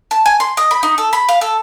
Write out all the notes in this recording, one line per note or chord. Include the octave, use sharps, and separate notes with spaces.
A5
G#5
C6
D#5
B5
D#4
A4
B5
F5
A4